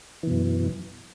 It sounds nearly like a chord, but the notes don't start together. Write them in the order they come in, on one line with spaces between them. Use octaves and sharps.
E3 B2 F#2